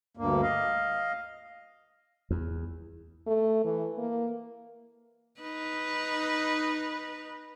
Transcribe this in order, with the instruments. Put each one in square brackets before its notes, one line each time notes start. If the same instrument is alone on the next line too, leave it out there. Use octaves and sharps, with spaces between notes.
[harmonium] D2 G2 A#3
D#5 F5
[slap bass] E2
[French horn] A3
E3
A#3
[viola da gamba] D#4 B4